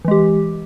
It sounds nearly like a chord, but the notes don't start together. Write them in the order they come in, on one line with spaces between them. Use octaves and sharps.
E3 G#3 G4